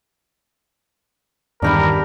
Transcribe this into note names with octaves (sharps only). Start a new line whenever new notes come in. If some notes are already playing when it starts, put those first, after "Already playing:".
E2 G2 D#3 D4 G4 A#4 B5